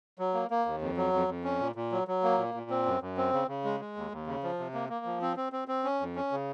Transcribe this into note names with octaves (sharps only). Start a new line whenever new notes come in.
F#3
A#3
A#3
D#2
F2
F#3
F2
F2
C#4
A#2
A#2
F#3
F#3
A#3
A#2
A#2
C4
F#2
F#2
C4
C#3
C#3
G#3
G#3
D#2
D#2
C#3
F3
C3
A#3
A#3
F3
C4
C4
C4
C4
C#4
F2
C#4
C#3